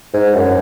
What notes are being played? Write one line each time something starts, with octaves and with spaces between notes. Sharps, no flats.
G#2
F#2